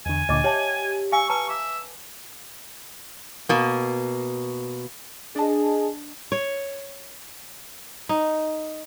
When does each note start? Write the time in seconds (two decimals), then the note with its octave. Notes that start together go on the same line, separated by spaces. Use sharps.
0.06 E2 D3 G#5
0.29 D2 A#2 D3 D#5 D6
0.44 G4 C#5 E5 A5
1.12 F5 G#5 C#6 E6
1.30 B4 A5 A#5 C#6
1.49 E5 D6
3.49 B2 A#3
5.36 D4 G#4 D#5 A5
6.32 C#5
8.09 D#4